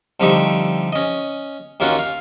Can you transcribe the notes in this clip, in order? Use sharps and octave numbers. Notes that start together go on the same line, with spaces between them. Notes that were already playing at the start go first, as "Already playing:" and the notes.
C2 D3 F3 D#4 G4 C#6
C#4 D#5
D#2 A#3 C#4 F4 F#4
F5